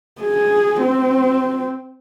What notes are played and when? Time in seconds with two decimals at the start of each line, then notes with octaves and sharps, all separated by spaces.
0.21 G#4
0.81 C4